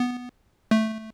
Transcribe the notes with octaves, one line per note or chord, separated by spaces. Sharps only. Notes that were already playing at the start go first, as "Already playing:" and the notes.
Already playing: B3
A3